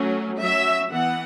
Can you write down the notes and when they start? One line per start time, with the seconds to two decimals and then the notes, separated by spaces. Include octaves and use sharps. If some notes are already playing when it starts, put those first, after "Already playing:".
Already playing: F#3 A3 C#4
0.39 F#3 C#4 E5
0.91 E3 B3 F#5